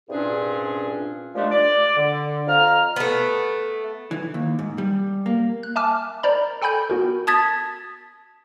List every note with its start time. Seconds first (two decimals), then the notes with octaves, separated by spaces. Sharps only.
0.09 C2 G2 A#2 C#4 D4 G#4
1.35 A#2 F3 G#3 A3 D4 G4
1.52 D5
1.96 D3
2.47 F2 F5 A#5 F6
2.96 A3 B3
4.11 E3
4.34 D#2
4.59 G#2
4.78 G3
5.26 A#3
5.63 F#6
5.76 E5 G#5 A5 D6 F6
6.23 A#4 C5 D5 A#5 B5
6.62 A4 G5 G#5 B5 G6
6.90 B3 F#4 A#4
7.27 A5 D#6 G#6 A6 B6